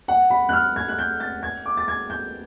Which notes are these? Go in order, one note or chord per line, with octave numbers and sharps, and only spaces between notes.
F#5
B5
F#6
F6
G#6
F#6
G6
A6
G#6
D6
A6
G#6
G6